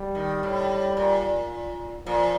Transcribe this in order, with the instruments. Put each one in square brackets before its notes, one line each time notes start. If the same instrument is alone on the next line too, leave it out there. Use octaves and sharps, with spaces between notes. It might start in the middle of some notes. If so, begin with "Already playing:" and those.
Already playing: [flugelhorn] G3
[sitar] D#3
A2
A#2
[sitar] A#2 [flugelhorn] F3